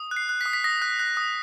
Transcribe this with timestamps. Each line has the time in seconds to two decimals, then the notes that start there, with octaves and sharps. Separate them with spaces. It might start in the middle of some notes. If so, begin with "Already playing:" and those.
Already playing: D#6
0.11 F#6
0.16 C7
0.29 F#6
0.41 B6
0.46 D#6
0.53 B6
0.64 D#6 A#6
0.82 F#6
0.99 F#6
1.17 D#6